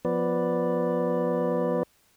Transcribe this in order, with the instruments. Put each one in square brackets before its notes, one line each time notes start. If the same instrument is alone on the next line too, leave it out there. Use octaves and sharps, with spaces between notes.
[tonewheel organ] F3 B3 B4 D5